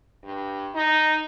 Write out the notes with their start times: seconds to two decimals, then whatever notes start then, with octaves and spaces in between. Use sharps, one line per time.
0.24 G2
0.75 D#4